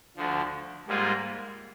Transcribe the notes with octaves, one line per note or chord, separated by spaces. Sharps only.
D2 D3 F3
G#2 G3 A#3 F4 G#4